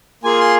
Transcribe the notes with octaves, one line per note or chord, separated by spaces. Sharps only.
A#3 F4 G#4 G#5
C6